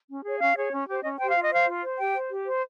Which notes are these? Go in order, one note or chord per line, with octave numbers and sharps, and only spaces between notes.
C#4
G#4 C#5
C#4 F5
G#4 C#5
C#4
G4 C5
C#4 D#5
G4 C5 G5
F4 F5
D#5
C5 F5
F4
C5
G4 G5
C5
G4
C5